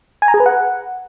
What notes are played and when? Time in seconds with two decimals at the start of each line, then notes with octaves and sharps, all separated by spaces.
0.22 G#5
0.28 A#5
0.34 G#4
0.40 B4
0.46 F#5